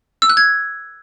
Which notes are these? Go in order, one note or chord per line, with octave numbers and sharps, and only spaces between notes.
E6
F#6
G#6